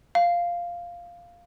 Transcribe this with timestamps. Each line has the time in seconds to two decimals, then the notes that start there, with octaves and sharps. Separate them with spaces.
0.15 F5